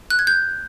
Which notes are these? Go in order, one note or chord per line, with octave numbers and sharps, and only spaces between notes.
F#6
G#6
G6